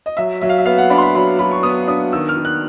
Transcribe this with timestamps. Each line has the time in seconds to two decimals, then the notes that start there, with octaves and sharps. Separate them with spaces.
0.06 D#5
0.17 F#3 E5
0.41 F#3 E5
0.49 F5
0.58 E5
0.65 B3 F5
0.78 F#5
0.90 D4 B5
0.98 C6
1.02 B5
1.15 F#3 B5
1.39 F#3 B5
1.51 C#6
1.63 B3 D#6
1.87 D4 D#6
2.13 D#3 E6
2.29 F6
2.37 D#3
2.45 F#6